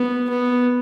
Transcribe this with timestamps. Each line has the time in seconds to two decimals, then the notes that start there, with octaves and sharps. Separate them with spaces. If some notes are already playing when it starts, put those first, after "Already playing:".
Already playing: B3
0.30 B3